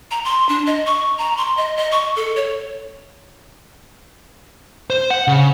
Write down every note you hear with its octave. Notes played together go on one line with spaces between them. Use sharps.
A#5
C6
D4
D#5
C#6
A#5
C6
D#5
D#5
C#6
A4
C#5
C5
F#5
C#3